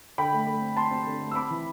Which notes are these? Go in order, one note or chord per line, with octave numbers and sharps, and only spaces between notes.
D3 G5 B5
A3
A3
C4
C4 A5 C6
C4
D3
A3
E6
C4 B5 D6
E3